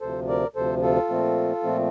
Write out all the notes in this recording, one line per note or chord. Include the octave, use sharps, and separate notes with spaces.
D2 C3 F3 A4 C5
A#4 D5
D2 C3 F3 A4 C5
F4 A4
A#2 F3 A3 C4
A#2 F3 A3 C4